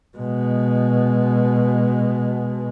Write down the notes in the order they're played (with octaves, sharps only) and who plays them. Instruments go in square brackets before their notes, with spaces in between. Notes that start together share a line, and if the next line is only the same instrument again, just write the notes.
[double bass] B2 G#3